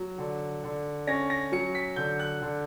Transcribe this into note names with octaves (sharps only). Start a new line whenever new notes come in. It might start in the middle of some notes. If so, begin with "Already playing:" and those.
Already playing: F#3
D3
D3
C#4 A#6
A#6
F#3 C#7
B6
D3 G6
F#6
D3